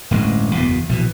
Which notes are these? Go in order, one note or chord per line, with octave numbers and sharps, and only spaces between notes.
D1 A1 G2 G#3
F#1 E2 B2
A#1 B2 E3